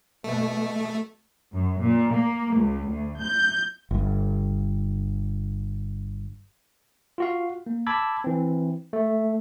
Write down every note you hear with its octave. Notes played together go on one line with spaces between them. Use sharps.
B2 A3
F#2
A#2
A#3
C#2
D2
G6
G1 G2
F4 F#4 F5
A#3
A5 B5 D6 E6 G#6
E3 C4
A3